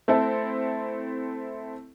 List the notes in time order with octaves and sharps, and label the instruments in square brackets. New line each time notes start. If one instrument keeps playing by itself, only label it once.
[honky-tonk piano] A3 C4 E4 A4